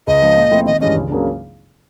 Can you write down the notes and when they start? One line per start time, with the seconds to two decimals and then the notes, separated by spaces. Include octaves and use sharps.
0.07 C#2 D#5
0.22 C#3 F3 G#3
0.36 A#2
0.51 F3 A3 C4 E4
0.66 G#1 D#5
0.81 G2 E3 G#3 C#4 D#5
0.95 C#2
1.10 C#3 F#3 A#3 D4